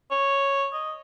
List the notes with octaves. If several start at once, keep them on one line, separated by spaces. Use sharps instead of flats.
C#5
D#5